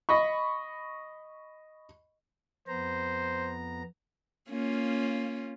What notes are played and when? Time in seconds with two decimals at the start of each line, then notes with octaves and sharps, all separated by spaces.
0.09 D#5 B5 C#6
2.68 F2 B3 C5 A#5
4.49 A#3 C#4 F4